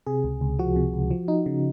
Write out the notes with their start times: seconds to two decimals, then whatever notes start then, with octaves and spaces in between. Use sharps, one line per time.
0.07 C3 G#4
0.24 C#2
0.41 C#2
0.59 F3 F#4
0.76 C3
0.93 C#2
1.11 F3
1.28 D#4
1.46 C#3